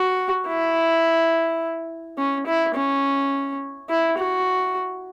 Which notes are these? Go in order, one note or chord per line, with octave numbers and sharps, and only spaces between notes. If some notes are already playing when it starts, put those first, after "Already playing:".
Already playing: F#4
E4
C#4
E4
C#4
E4
F#4